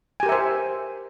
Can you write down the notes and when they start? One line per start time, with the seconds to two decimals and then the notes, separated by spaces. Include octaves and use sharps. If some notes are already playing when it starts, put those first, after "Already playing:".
0.20 G#5
0.23 G4
0.26 A#4
0.29 E5
0.32 C5